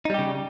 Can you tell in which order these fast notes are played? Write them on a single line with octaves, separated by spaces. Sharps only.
D#4 G3 G4 C#3